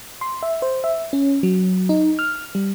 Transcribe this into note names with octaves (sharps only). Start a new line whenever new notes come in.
C6
E5
C5
E5
C#4
F#3
D#4
F6
G3